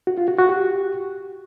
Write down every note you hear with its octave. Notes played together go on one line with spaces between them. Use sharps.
F#4
F4
F#4
F#4
G4